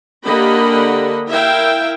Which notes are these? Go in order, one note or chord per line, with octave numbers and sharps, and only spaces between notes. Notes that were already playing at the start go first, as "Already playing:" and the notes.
D3 A#3 G4 D#5 F#5 B5
E4 A#4 E5 F5 G5